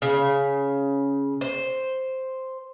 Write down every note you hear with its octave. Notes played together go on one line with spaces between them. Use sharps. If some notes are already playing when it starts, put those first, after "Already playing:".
C#3
C5